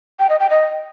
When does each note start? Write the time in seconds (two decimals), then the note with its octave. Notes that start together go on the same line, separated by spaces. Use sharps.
0.19 G5
0.30 D#5
0.40 G5
0.50 D#5